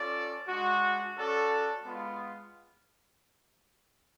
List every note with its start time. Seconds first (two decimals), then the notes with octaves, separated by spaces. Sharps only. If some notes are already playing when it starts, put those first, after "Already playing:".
Already playing: C#4 F4 A4 D5
0.48 G#3 D4 F#4
1.16 C#4 F#4 A4 D5
1.83 G#3 B3 F4